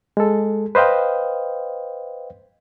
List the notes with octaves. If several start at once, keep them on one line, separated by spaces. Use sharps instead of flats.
G#3 A4
B4 C5 D#5 F5 G5